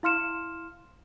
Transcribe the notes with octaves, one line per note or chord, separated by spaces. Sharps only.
E4 F5 C6 F6 C#7 E7